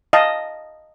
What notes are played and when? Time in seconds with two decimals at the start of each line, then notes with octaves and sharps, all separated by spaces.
0.13 D#5 F5 A5